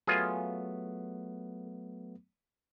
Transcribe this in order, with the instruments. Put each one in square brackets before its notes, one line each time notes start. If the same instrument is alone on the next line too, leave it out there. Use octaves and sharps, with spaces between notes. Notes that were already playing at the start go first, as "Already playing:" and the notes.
[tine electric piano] F#3 A3 B3 [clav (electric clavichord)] F4 G#4